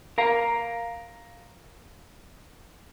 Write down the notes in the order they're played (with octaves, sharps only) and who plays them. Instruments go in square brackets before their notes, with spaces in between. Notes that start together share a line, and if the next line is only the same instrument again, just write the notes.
[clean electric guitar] A#4 F5 A#5